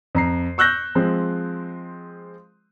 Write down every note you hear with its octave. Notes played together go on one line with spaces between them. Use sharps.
F2 A#5 C7
C#6 E6 F#6 G6 A#6
F3 G#3 C4